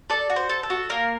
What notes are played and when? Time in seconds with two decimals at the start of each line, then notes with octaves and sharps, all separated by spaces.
0.10 A4 D5
0.30 F#4
0.36 C5
0.49 A4
0.63 A4
0.70 F#4
0.90 A#3 A#4